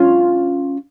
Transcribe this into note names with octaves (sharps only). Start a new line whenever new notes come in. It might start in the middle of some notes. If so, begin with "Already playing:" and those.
Already playing: C#4 F4